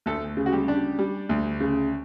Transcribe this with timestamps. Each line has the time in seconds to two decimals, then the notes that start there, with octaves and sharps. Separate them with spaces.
0.06 D2 A3 A4
0.37 C#3
0.46 F#4
0.53 G3 G4
0.68 D4
0.99 G3
1.29 D2
1.60 C#3